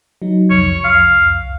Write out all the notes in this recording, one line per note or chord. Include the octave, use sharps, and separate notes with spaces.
F#3 D#4
C2 F2 C#5
F5